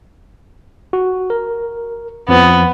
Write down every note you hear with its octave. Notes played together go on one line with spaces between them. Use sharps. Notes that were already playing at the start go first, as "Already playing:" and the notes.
F#4
A#4
F2 F3 B3